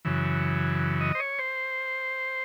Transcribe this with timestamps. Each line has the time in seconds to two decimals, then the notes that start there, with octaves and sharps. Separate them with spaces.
0.05 F#2 C#3 E3
1.01 D#5
1.15 C5
1.20 C#5
1.39 C5